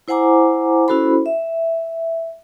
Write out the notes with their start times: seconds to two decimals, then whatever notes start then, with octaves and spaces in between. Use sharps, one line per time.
0.08 E4 C5 F#5 G#5 A#5 D6
0.88 C#4 E4 F#4 A4 C5 B5
1.26 E5